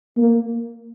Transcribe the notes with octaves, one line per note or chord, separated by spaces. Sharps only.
A#3